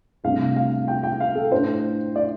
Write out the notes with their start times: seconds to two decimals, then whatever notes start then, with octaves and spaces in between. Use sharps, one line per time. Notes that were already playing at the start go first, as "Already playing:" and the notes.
0.24 C2 C3 A3 D4 F5
0.56 F5
0.88 G5
1.03 G5
1.20 F5
1.35 A4
1.51 A2 A3 D4 C5
2.16 D5